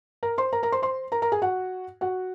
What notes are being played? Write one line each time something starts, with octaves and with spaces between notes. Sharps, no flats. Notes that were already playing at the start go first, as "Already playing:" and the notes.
A#4 A#5
C5 C6
A#4 A#5
A#4 A#5
C5 C6
C5 C6
A#4 A#5
A#4 A#5
G#4 G#5
F#4 F#5
F#4 F#5